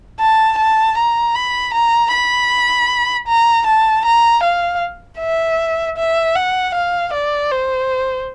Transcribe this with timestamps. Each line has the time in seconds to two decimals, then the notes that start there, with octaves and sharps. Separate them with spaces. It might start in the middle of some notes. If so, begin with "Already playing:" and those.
0.20 A5
0.58 A5
0.97 A#5
1.35 B5
1.74 A#5
2.13 B5
3.27 A#5
3.66 A5
4.05 A#5
4.43 F5
5.20 E5
5.97 E5
6.35 F#5
6.74 F5
7.13 D5
7.51 C5